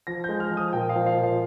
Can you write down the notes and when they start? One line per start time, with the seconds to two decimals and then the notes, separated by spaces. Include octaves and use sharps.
0.07 F3 A#6
0.24 G#3 G6
0.40 F6
0.51 F3
0.57 D#6
0.73 A#2 G5
0.89 F5
0.96 F3
1.06 F5
1.18 A#2
1.23 F5